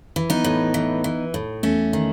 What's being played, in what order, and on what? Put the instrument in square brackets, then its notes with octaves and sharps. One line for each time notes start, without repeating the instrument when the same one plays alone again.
[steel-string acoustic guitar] E3
B3 D#4
A2
E3
E3
A2
E2 A3 C#4
D#3